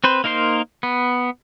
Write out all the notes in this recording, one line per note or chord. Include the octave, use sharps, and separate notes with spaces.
C4 B4 C5
A#3 D#4 A#4 C5 C6
B3